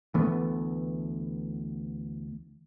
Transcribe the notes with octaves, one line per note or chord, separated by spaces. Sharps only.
D2 E3 A3 B3